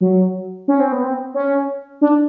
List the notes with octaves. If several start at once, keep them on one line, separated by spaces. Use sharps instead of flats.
F#3
C#4
C4
B3
C4
C#4
D4